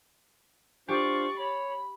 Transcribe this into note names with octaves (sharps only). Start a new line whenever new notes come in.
D4 F4 G4 C5 D5 C#6
C#5 B5